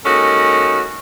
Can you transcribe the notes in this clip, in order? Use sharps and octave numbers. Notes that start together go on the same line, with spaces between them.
G#3 A#3 C#4 D#4 F#4 A4